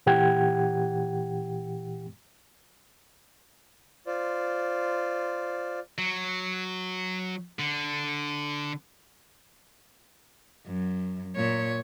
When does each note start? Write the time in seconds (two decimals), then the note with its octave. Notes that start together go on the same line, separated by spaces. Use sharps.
0.06 A#2 E3 G4 F#5 G5 G#6
4.07 F4 C5 D5
5.98 F#3
7.59 D3
10.66 F#2
11.36 A#2 C#5